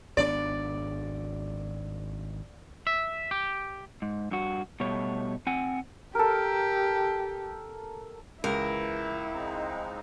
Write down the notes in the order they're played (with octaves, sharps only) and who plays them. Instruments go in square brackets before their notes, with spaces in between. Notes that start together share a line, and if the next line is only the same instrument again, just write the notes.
[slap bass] G#1 B3 D4 [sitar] D5
[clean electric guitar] E5
G4
[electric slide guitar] G#2
G2 F#4
B2 G3 A3 C#5
C4 F#5 G#5
[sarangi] G4 [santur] A4 A#4
[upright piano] C#2 [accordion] E3 [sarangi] E4 [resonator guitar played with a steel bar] A#4
[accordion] G#3 C4 D#4